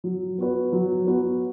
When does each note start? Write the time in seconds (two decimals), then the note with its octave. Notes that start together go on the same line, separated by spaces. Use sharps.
0.04 F#3
0.38 B3 F#4 B4
0.73 F#3
1.06 B3 F#4 B4